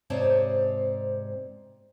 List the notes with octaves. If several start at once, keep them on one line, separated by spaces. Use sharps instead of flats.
G#2 C3 C4 C#5 D5 A5